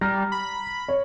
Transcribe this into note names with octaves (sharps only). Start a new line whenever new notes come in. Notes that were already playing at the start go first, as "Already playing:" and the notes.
G3 A#5 F6 A#6
B5
C#5